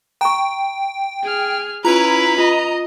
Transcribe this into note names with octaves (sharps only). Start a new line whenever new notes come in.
G5 A#5 C#6
G#4 F6
C#4 E4 F4 B4 A#5
F4 D#5